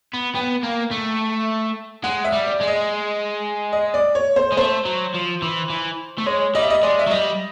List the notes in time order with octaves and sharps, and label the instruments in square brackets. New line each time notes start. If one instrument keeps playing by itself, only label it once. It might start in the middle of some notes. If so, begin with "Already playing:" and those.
[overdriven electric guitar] B3
[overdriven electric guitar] B3 [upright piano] G5
[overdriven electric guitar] A#3
A3
[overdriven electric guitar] G#3 [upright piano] F#5
[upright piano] E5
[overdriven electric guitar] G3
[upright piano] D5
[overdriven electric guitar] G#3
[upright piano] D#5
D#5
D5
C#5
C5
[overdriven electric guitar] G#3
[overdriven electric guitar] A3 [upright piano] C5
[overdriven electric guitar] F#3
F3
E3
E3
A3
[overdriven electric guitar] G#3 [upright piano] C#5
[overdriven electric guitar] G3 [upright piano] D#5
[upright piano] E5
D#5
[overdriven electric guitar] G#3 [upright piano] D5
[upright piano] E5
[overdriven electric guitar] F#3
[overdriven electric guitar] G3 [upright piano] D#5